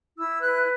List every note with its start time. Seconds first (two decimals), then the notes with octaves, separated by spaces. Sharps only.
0.17 E4 E6
0.40 B4 F#6